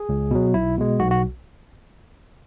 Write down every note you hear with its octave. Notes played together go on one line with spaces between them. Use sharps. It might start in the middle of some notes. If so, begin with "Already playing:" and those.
Already playing: G#4
C#2
B2 F#3
B1 E4
B2 G#3
B1 F#4
F#4